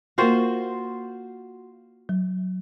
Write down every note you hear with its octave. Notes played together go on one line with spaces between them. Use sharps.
A#3 F4 F#4 A#4 C5 G5
F#3